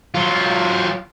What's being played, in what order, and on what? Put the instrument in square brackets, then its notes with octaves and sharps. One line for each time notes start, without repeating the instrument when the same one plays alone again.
[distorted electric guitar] F#3 F4